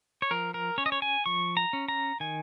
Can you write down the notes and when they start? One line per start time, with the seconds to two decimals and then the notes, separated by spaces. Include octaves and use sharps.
0.22 C#5
0.31 F3 A#4
0.54 A#4
0.78 C#4 C#5
0.86 D#5
0.92 C#5
1.02 G#5
1.26 F3 C#6
1.57 A#5
1.73 C#4
1.88 A#5
2.20 D#3 G#5